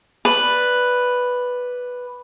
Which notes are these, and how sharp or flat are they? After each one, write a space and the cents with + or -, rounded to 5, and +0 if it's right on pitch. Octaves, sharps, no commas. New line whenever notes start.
B4 +0 D5 +0